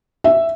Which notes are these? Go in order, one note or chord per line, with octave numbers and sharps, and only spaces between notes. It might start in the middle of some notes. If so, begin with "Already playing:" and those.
E5